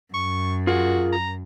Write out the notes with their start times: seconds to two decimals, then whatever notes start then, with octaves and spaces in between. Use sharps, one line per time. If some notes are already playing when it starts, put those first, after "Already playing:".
0.14 F#2 C#6
0.67 F4 F#4 G#4 A#4
1.12 A#5